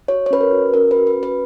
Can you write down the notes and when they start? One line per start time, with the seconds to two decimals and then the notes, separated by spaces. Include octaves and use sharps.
0.08 F#4 C#5
0.26 C#5
0.31 C#4 B4
0.41 A#4
0.52 F#4
0.74 C#4 A#4
0.91 B4
0.96 F#4
1.07 B4
1.18 C#4
1.23 B4